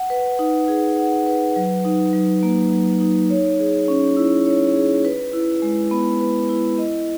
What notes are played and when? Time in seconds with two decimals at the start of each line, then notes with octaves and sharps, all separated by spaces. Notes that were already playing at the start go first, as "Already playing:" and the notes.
Already playing: F#5
0.10 B4
0.39 D#4
0.68 G#4
0.98 F#5
1.26 B4
1.56 F#3
1.85 D#4
2.13 F#3
2.43 A#3
2.71 F#3
3.00 D#4
3.30 C#5
3.60 G#4
3.88 C#4
4.17 E4
4.46 C#5
4.76 G#4
5.05 B4
5.33 E4
5.62 G#3
5.91 B3
6.20 B4
6.49 E4
6.78 D#5